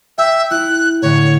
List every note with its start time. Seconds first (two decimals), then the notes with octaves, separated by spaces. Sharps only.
0.18 E5 G5
0.51 E4 F#6
1.02 A2 D3 C#5 G#6